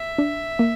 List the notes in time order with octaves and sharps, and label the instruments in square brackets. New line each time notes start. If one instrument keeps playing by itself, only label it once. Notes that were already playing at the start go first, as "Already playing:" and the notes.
Already playing: [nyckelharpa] E5
[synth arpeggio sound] D4
A#3